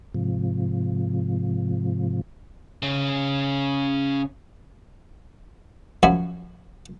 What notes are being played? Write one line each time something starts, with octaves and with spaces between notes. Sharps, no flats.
G#2 C3 F3
C#3 C#4
F#2 F3 F#4 E5 G#5 B5